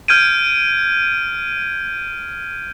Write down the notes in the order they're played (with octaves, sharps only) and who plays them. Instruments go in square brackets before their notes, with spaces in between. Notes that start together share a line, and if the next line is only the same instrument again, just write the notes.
[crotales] F6 G6 G#6 D7 D#7